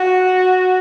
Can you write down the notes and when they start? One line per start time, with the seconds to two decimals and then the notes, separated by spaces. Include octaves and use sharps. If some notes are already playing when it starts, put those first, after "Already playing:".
Already playing: F#4